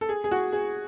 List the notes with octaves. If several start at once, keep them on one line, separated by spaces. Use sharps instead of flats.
A4
G#4
G#4
F#4
G#4